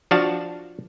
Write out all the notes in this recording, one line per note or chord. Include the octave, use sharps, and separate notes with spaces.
F3 D4 F#4 F5 A5